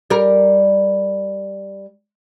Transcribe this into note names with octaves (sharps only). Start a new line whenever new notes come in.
G3 A#4